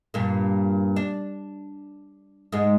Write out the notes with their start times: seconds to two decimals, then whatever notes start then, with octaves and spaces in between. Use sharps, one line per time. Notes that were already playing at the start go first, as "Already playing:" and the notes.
0.14 G2 A#2
0.96 D4
2.52 G#2 G#3